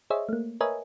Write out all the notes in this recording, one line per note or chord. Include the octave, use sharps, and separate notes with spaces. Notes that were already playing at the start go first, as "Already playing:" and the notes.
G#4 C5 C#5 D#5 E5
A3 A#3
A#4 B4 C#5 D#5 E5 G#5